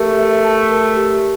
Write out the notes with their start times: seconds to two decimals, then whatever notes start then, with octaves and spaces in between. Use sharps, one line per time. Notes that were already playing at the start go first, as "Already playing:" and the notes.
Already playing: A3 G4 A#4
0.18 E5
0.44 A5
0.71 A#4
0.97 G4